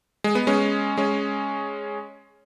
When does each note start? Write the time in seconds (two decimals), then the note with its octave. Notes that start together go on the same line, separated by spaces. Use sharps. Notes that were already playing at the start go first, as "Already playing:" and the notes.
0.24 G#3
0.35 B3
0.47 G#3 C#4
0.97 G#3 C#4